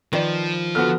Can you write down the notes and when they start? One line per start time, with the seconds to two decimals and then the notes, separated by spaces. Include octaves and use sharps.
0.13 D#3 F3 B4 D5
0.75 D3 B3 F#4 F6